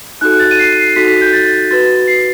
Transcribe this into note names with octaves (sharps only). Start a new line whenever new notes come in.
D#4 F#4 A4 F#6
A6
D#7
C7
C7
D#4 F#4 A4 B6
G6
A6
F#4 B4 A6
C7